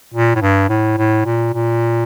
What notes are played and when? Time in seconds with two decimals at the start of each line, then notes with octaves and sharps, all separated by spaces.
0.14 A#2
0.35 A2
0.42 G2
0.69 A2
0.98 A2
1.25 A#2
1.53 A#2